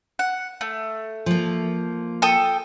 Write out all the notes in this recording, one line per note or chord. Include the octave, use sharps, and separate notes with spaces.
F#5
A3
F3 A#3
A4 G5 D#6